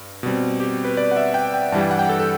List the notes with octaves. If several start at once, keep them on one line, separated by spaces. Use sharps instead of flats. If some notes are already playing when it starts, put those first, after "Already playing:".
Already playing: G2
B2 G3 C4
G4
B4
D5
F#5
E5
G5
G5
G2 E3 G3 A5
G5
F#5
G5
A4
A4